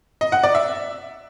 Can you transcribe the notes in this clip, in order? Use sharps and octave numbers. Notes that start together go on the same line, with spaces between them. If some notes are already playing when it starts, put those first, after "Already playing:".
D#5
F#5
D5
E5